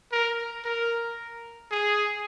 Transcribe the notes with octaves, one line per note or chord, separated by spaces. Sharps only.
A#4
A#4
G#4